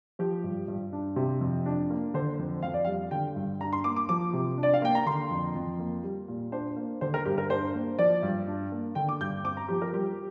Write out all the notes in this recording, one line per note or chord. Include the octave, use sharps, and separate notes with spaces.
F3 G4
G2
G2
D4
C3
F2
D4
A#3
D3 C5
F2
F2 F5
D5
G3 F5
D3 G5
G2
D4 A#5
C6
A#3 D6
D6
F3 D6
C3
D4
D5
F5
A#3 G5
A#5
D3 C6
F2
F2
A#3
G3
A#2
D4 C5
A#3
D3 C5
A#4
G2 G4
A#4
D4 C5
A#3
F3 D5
G2
D4
A#3
D3 G5
D6
G2 G6
C4 D6
A#5
F3 G4
A#4
G3 G4